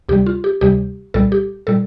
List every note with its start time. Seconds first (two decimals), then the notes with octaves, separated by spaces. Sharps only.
0.09 D2 C3 G3 G4
0.26 F4
0.44 G4
0.61 D2 C3 G3 G4
1.14 C2 A#2 G3 A4
1.32 G4
1.67 A#2 G3 A4